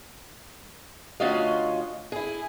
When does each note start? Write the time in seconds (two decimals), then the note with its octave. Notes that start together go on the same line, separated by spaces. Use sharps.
1.20 D2 C#4 F4 F#4 D#5 F5
2.12 E4 G#4